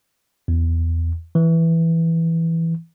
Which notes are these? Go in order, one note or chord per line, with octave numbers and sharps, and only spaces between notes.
E2
E3